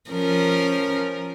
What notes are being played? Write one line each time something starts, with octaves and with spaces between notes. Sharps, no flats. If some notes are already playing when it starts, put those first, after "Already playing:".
F3 C#4 A#4